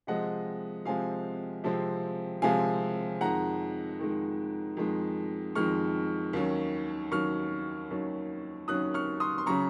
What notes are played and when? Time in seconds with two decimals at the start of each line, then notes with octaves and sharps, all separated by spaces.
0.07 C3 F3 G#3 C4 D#5 F#5
0.85 C3 F3 G#3 C4 F5 G#5
1.64 C3 F3 G#3 C4
2.42 C3 F3 G#3 C4 F5 G#5
3.21 F2 D#3 G#3 F#5 A#5
4.00 F2 D#3 G#3
4.77 F2 D#3 G#3
5.55 F2 D#3 G#3 C#6 F6
6.33 D#2 D#3 F#3 C#4
7.12 D#2 D#3 F#3 C#4 C#6 F6
7.91 D#2 D#3 F#3 C#4
8.68 D#2 D#3 F#3 C#4 D#6 F#6
8.94 C#6 F6
9.20 C6 D#6
9.38 C6
9.46 C#3 F#3 C#4 A#5 C#6